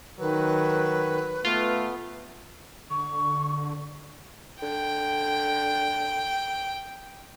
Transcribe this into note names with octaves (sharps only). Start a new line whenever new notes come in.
D#3 F#3 B4
A3 B3 F4
D3 C#6
D3 G5